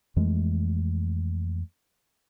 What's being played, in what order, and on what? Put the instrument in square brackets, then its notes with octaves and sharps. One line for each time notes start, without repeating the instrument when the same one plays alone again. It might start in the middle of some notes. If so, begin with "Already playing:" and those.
[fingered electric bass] F2 E3 G#3 A3